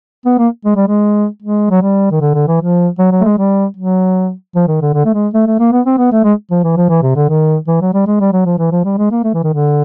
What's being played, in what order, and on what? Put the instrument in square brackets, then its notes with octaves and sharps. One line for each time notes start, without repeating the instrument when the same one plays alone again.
[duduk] B3
A#3
G#3
G3
G#3
G#3
F#3
G3
D#3
D3
D3
E3
F3
F#3
F#3
A3
G#3
G3
F#3
F3
D#3
D3
D3
A3
G#3
A3
A3
A#3
B3
C4
B3
A3
G#3
F3
E3
F3
E3
C3
D3
D#3
E3
F#3
G3
G#3
G3
F#3
F3
E3
F3
G3
G#3
A#3
A3
E3
D#3
D3